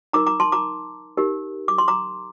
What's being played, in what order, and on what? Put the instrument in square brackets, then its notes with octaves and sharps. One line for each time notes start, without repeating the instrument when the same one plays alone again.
[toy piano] D#4 A#4 A#5 D6
A#5 D6
A5 C6
A#5 D6
D#4 G4 A#4
D6
C6
A#5 D6